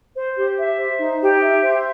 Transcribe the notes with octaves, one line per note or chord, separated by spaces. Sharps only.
C5
G4
E5
C5
D#4
G4
E5
C5